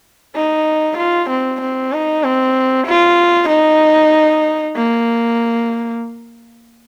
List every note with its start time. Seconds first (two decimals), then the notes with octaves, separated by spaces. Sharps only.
0.35 D#4
0.98 F4
1.30 C4
1.61 C4
1.93 D#4
2.24 C4
2.87 F4
3.49 D#4
4.76 A#3